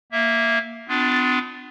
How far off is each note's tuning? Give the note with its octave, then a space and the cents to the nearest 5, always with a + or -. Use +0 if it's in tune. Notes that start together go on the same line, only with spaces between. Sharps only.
A#3 +0 E5 +0
B3 +35 D4 +0 F4 +10